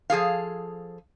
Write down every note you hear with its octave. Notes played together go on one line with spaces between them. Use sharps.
F3 G#4 A4 F5